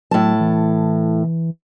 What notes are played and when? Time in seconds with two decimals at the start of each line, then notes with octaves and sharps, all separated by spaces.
0.11 A2 F#3 A5
0.40 E3